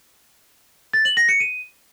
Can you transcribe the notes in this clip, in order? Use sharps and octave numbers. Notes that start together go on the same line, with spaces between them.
A6
F#7
A#6
C#7
D#7